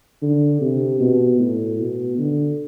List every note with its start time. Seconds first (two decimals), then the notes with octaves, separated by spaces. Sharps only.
0.22 D3
0.61 C3
1.00 B2
1.40 A2
1.79 B2
2.18 D3